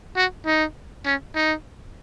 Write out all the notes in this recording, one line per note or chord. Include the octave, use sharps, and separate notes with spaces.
F#4
D#4
C#4
D#4